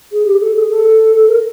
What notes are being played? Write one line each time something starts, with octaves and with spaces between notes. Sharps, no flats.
G#4
G4
A4
G#4
A4
A#4